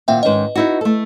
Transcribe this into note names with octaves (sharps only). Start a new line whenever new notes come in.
A#2 D#3 C4 E5 F#5 G5
G#2 D#3 C#4 B4 D#5
D#4 E4 F#4
A3 A4